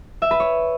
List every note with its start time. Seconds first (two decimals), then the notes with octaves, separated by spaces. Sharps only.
0.22 E5
0.31 B4
0.40 C#5